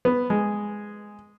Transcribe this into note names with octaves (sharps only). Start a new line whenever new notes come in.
B3
G#3